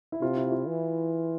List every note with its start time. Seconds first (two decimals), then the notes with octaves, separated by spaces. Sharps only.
0.12 E4
0.21 C3 F4
0.37 E4
0.52 F4
0.67 E3